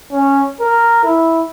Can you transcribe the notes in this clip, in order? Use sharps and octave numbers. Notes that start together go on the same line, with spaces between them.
C#4
A#4
E4